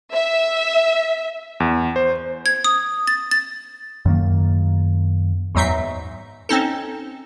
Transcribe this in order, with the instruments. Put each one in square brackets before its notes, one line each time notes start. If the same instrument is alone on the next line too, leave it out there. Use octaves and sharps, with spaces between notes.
[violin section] E5
[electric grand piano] E2
C5
[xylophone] G#6
D#6
A6
A6
[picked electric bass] F#2 D#3 A#3
[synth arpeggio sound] E2 G#2 F#3 D#4 E5 C7
C4 C#4 D#4 A4